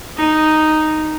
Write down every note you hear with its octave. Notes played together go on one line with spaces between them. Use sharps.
D#4